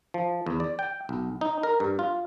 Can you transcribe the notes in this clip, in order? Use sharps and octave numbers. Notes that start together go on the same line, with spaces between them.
F3
E2
D5
G5
B1
D#4
A#4
G2
F4